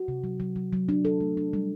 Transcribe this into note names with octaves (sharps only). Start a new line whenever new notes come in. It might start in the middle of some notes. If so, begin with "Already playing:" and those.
Already playing: F#4
C3
F#3
F#3
F#3
F#3
D4
A4
A3
D4
G3